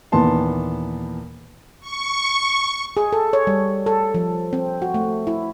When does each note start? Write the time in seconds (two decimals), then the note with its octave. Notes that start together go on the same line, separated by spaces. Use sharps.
0.12 D#2 A#2 E3 B3 A5 C6
1.80 C#6
2.97 G#4
3.13 A4
3.33 C#5
3.47 G3
3.86 A4
4.15 F3
4.53 C4
4.82 F#4
4.94 A3
5.27 E4